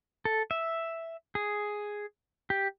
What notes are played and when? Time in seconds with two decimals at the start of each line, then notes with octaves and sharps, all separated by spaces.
0.25 A4
0.51 E5
1.35 G#4
2.50 G4